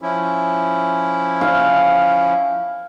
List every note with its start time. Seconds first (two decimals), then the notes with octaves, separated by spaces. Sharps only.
0.01 F3 C#4 E4
1.41 F5